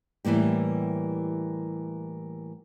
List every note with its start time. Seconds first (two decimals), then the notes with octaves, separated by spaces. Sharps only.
0.25 A2 E3 G3 A#3 G4